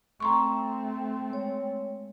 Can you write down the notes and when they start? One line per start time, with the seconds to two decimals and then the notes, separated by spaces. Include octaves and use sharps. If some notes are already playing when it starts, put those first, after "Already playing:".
0.20 A3 C4 A#5 C6 C#6
1.30 G#3 C#5